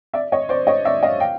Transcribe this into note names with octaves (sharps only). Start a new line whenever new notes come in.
D5 E5
C#5 D#5
C5 D5
C#5 D#5
D5 E5
D#5 F5
F5 G5